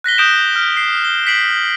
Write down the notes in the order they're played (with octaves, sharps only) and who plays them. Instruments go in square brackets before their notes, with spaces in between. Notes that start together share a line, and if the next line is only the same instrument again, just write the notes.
[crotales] F#6 A#6 B6 G7
D#6 G6 D7 E7
F6
C7
G7
B6 C7 D7 F#7